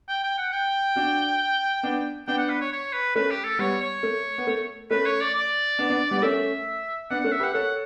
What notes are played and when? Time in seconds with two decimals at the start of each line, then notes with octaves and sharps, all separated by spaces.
0.09 G5
0.24 G5
0.38 F#5
0.53 G5
0.96 D4 F#4
1.83 B3 D4
2.27 B3 D4 G5
2.38 F#5
2.50 B4
2.61 C#5
2.72 C#5
2.93 B4
3.15 A3 C#4 B4
3.31 G4
3.44 A4
3.59 G3 B3 C#5
3.81 C#5
4.03 A3
4.38 B3
4.47 A3
4.91 A3 C#4 B4
5.06 C#5
5.21 D5
5.34 D5
5.79 B3 D4
5.90 B3 D4
6.11 G3 B3
6.18 D5
6.22 A3 C#4 E5
7.10 B3 D4 F#5
7.21 A3 C#4 F#5
7.32 E5
7.40 G4 B4
7.44 F#5
7.54 A4 C#5 F#5